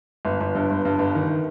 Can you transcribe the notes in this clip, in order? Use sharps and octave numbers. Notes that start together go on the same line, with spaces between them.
G1
G1
G2
G1
G2
G1
D#3